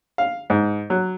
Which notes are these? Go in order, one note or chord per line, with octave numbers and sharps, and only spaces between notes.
F5
G#2
F#3